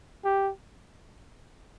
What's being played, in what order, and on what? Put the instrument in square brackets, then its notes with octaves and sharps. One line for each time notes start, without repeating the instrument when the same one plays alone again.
[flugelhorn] G4